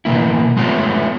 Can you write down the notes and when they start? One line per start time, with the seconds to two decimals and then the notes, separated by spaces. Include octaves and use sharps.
0.05 B2 E3 A#3 E4
0.57 G#3 A3 B3 F4 C#5